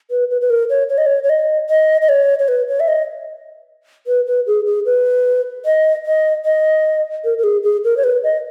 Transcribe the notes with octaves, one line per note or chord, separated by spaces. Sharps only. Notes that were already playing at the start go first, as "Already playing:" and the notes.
B4
B4
B4
A#4
C#5
C#5
D#5
C#5
C#5
D#5
D#5
D#5
C#5
C#5
B4
C#5
E5
D#5
B4
B4
G#4
G#4
B4
D#5
D#5
D#5
A#4
A#4
G#4
G#4
A#4
C#5
B4
D#5